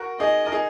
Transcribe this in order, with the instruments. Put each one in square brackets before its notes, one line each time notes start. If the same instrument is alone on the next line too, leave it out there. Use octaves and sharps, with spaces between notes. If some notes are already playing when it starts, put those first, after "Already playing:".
Already playing: [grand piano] F#4 A#4
[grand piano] D#4 G#4 [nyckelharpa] D#5
[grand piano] A#4
D#4 G#4